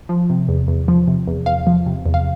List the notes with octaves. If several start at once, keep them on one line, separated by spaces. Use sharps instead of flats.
F3
C3
E2
E2
F3
C3
E2
E2 F5
F3
C3
E2
F5